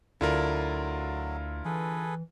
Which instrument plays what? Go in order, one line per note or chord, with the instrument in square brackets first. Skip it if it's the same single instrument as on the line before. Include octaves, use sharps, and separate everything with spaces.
[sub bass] D2 [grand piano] D3 [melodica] F#3 [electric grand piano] E4 F4 A#4
[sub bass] E3 [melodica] G#4 A4 B4